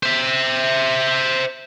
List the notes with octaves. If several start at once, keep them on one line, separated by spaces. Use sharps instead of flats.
C5 E5